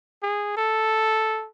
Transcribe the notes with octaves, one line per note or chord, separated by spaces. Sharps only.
G#4
A4